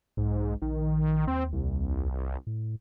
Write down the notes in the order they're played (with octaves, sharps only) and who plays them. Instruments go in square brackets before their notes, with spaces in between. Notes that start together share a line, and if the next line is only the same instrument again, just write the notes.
[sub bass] B1 [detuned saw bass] G#2
[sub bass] A#1 [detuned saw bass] D#3
[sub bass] D#2 [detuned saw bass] C4
[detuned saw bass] C2
[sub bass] A2